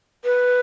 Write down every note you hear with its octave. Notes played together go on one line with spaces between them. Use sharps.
B4